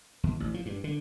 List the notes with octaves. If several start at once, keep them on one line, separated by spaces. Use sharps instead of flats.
D#2
A1
F3
G2
D3